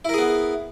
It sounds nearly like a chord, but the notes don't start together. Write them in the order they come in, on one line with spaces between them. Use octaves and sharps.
E4 A#4 G#4 B3